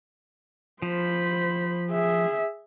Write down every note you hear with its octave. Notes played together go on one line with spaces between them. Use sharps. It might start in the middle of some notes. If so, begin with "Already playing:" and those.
F3 C5 B5
G#4 E5